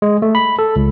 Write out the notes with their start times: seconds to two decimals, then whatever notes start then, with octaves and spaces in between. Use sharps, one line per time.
0.02 G#3
0.22 A3
0.35 B5
0.59 A4
0.76 C#2